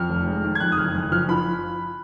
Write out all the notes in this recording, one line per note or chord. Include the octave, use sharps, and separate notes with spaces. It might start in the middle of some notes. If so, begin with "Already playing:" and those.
Already playing: F2 F6
F1
G#3
D#3
G#6
F2 F#6
D#6
F#1 F6
F#1 F#6
F3 F6
F3 B5